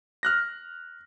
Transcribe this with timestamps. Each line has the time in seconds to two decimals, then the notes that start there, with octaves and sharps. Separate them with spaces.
0.23 F6 F#6 A#6